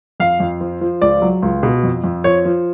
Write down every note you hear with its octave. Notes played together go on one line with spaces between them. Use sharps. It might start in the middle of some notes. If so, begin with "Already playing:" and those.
F2 F5
F2
F3
F3
C#2 D5
F#3
C#2
B2
F2
F2
F3 C#5
F3